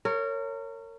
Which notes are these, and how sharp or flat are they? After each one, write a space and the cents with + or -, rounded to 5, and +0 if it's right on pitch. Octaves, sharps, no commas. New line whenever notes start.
A#4 -30 C#5 +0